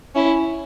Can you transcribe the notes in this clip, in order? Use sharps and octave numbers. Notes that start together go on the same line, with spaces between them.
C#4 E4